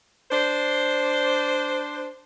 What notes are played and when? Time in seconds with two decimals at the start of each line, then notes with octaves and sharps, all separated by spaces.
0.31 D4 C5